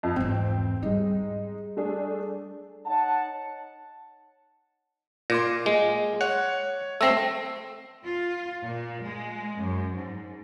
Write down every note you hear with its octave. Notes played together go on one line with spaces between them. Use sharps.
F2
E2 G#2 C4
G3 G#3 D#4
A3 D4 G#4
D#4 C#5 F#5 A5
A#2 C6 D6 A#6
G#3
C#5 F#5
A3 C4 E6 A#6 C7
F4
A#2
G#3
F#2
G#2